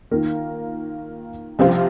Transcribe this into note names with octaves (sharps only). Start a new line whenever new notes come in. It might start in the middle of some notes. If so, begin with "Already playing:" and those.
D#3 A#3 F4 A#4
C2 C3 F3 C4 F4